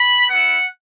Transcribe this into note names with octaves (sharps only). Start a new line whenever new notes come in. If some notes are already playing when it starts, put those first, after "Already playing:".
Already playing: B5
B3 E4 F#5